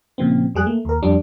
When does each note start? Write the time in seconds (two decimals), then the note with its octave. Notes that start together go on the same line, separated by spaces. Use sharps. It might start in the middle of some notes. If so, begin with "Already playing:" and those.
0.18 A#2 C#3 F3 C4
0.55 F2 G3 G#4 F#6
0.66 A3 A#3
0.85 D#2 A#4
1.02 F2 G3 D4